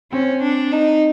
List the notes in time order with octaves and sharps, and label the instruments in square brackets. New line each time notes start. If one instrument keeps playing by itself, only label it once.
[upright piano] C4 [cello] C#4
[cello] D4
D#4